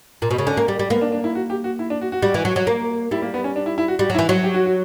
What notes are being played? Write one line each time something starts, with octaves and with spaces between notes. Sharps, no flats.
A#2
B2
C#3
D3 C#4
A#3
G3
G3
A#3 B3
D4
D4
E4
F#4
G4
F#4
E4
D4
F#4
F#4
G3
E3
F#3
F#3
A#3
G3 E4
A#3
B3
C#4
D4
E4
E4
F#4
G3 F#4
F#3
E4
E3
F#3 F#4
G4
F#4
F#4